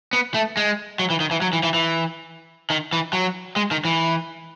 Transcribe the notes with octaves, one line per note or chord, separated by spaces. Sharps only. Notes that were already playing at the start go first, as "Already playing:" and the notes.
B3
A3
G#3
F#3
E3
D#3
E3
F#3
E3
E3
E3
D#3
E3
F#3
G#3
D#3
E3